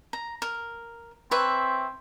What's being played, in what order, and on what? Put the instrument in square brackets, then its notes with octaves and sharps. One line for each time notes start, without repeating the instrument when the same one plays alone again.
[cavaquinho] A#5
A#4
[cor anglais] C4 [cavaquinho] B4 C#5 E5